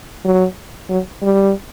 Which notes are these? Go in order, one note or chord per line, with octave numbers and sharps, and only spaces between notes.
F#3
F#3
G3